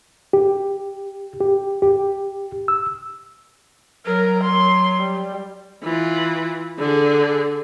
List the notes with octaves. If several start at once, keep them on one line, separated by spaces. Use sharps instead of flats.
G4
G4
G4
E6
F#3 A#4
C6
G3
E3 F4
D3 G#4